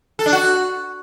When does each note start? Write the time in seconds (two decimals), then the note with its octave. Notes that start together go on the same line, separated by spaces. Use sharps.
0.19 A4
0.26 D4
0.33 F#4